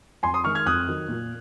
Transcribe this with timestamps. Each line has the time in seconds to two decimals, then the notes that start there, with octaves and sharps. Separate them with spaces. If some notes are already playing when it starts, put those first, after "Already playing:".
0.23 F2 G#5 C6
0.34 C6 D#6
0.44 D#3 G#3 C#6 F6
0.55 F6 G#6
0.66 F2 D#6 F#6
0.88 D#3 F#3
1.08 A#2